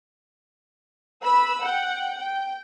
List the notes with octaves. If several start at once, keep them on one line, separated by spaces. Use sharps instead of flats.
B4 B5 E6
F#5 G5
G5